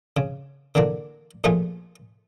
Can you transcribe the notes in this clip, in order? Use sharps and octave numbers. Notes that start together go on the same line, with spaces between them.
C#3
D3 E3 A#3 D4
A#2 F3 A3 F4 G#4